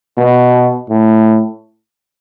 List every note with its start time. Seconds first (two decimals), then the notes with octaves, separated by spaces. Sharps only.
0.18 B2
0.90 A2